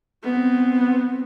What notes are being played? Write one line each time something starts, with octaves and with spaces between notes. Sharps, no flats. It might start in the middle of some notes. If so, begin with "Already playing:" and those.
B3 C4